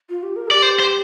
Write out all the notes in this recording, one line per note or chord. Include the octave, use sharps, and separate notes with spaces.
F4
G4
A#4
G4 D5
C5
C5